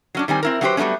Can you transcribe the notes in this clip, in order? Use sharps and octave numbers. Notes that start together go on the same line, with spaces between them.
F#3 C#4 D4
D#3 G3 C4 G#5
C4 E4 A#4
F#3 A#3 C#4 G4 B4 C5
F#3 G3 A3 B3 C#4